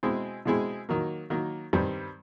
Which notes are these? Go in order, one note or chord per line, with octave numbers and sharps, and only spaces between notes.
B2 G#3 C4 E4 G#4
B2 G#3 C4 E4 G#4
D#3 F#3 A#3
D#3 F#3 A#3
G2 D#3 G3 C4